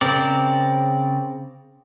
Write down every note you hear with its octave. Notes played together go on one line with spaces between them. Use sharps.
C#3 C4 A#4 D5